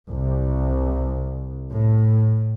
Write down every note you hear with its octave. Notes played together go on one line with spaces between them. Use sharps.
C2
A2